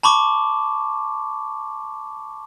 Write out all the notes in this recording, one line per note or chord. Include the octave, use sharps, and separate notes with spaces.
A5 B5 C#6 D6